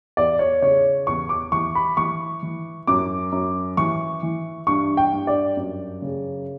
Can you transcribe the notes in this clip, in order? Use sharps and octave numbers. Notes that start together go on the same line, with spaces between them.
E2 D5
C#5
C#3 C#5
E2 C#6
D6
E3 C#6
B5
E3 C#6
E3
F#2 D6
F#2
E3 C#6
E3
G2 C#6
G5
G2
D5
F#2
C#3